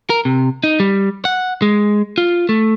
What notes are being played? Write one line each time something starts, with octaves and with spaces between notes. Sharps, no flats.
A#4
C3
D#4
G3
F#5
G#3
F4
A3